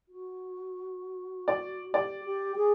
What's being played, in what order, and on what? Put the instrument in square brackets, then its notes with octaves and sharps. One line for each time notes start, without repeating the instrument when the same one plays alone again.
[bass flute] F#4
[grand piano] D5
[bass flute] G4 [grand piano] D5
[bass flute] G4
G#4